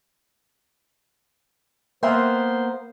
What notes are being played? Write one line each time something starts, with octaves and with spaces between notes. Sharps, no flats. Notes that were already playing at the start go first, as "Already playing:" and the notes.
A#3 B3 C5 E5 G5 C6